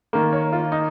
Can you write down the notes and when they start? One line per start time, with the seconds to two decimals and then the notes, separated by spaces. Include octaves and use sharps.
0.13 D#3 A#3
0.33 C#5
0.53 F4
0.72 D#4